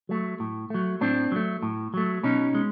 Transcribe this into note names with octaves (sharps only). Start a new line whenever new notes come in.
F#3 A3
A2
F#3 A3
A2 C4 D4
F#3 A3
A2
F#3 A3
B2 C#4 D#4
G#3